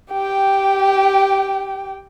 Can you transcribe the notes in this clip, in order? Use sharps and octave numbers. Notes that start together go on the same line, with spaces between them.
G4 G5